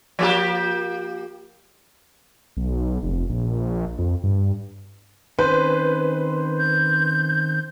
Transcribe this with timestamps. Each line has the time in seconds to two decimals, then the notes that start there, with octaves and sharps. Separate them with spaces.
0.19 F3 A#3 G4
2.57 B1
3.03 F1
3.29 A#1
3.99 F2
4.23 G2
5.39 D#3 C4 C#4 B4 C5
6.57 G6